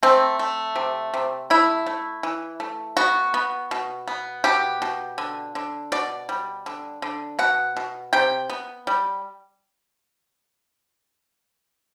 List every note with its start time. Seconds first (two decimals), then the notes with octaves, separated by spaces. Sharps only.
0.03 A3 C4
0.39 A3
0.76 C3
1.14 C3
1.50 A3 E4
1.86 A3
2.23 E3
2.60 A3
2.97 B3 F#4
3.34 B3
3.71 B2
4.08 B3
4.44 B2 G4
4.82 B2
5.18 D3
5.55 D3
5.92 B2 D5
6.29 G3
6.66 D3
7.02 D3
7.39 B2 F#5
7.77 B2
8.13 C3 G5
8.50 B3
8.87 G3